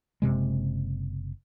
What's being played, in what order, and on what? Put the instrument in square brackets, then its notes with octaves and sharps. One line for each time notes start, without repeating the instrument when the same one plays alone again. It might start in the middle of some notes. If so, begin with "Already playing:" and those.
[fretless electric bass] F#1 E2 C3 G#3